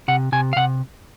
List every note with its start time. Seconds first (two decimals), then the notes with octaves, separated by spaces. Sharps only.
0.08 C3 F#5
0.32 C3 G#5
0.53 F5
0.56 C3 F#5